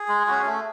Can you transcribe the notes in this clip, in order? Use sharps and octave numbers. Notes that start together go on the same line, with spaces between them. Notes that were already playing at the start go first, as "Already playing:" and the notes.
Already playing: G#4
G#3
C#4 F#4
A3